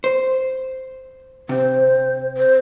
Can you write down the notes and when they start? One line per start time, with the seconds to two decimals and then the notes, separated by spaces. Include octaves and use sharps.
0.04 C5
1.49 C3 C5
2.37 C5